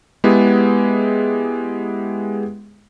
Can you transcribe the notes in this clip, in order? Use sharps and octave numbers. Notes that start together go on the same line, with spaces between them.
G#3 B3 E4 G4 G#4